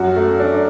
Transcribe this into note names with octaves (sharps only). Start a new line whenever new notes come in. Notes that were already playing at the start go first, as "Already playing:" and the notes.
Already playing: F#2 F#4
A3
D4